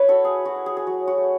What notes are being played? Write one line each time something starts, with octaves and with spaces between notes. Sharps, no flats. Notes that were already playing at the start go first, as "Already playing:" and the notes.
Already playing: E4 B4 C#5
F#4 A4
A3 G#4
F#4
E4
G#4
G#4
F#3 F#4
F#4
A3